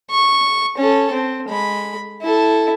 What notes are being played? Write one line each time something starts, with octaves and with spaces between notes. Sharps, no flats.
C#6
C#4 A4
C4
G#3 B5
E4 A4